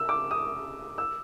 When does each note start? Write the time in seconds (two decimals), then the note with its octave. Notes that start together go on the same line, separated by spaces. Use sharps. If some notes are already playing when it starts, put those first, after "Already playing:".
Already playing: E6
0.09 D6
0.31 D#6
0.98 E6